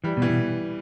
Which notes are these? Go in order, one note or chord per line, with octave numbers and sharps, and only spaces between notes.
E3 G3
B2
E3
B2